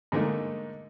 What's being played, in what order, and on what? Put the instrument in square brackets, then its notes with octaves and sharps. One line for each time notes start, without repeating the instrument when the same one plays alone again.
[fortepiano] G#2 D3 A3 A#3 D#4